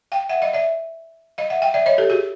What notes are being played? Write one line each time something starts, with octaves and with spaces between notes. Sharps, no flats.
F5 G5
E5 F#5
D#5 F5
D5 E5
D#5 F5
E5 F#5
F5 G5
D5 E5
C#5 D#5
G4 A4
F#4 G#4